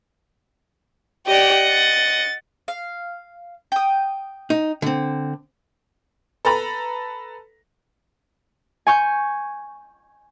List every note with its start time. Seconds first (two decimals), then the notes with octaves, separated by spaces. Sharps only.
1.27 G4 D5 D#5 F#5
1.69 A6
2.68 F5
3.72 G5 D#6
4.50 D#4
4.82 D3 C4
6.45 A4 B4 A#5 B5
8.87 G#5 C#6 G6